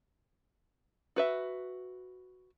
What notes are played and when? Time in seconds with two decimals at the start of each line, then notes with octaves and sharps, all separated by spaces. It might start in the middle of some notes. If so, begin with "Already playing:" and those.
1.16 F#4 B4 E5